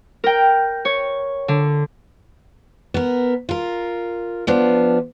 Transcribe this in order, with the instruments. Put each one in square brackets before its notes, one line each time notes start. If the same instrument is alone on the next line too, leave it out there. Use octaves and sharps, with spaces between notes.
[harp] A#4 G5
C#5
D3
[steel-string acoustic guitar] B3 A#4
F4 A#4
F3 B3 D4